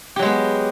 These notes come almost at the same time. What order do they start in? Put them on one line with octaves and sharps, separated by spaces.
G4 F#3 G#3 B3